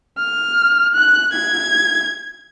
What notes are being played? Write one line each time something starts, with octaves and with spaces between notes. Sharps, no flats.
F6
F#6
G#6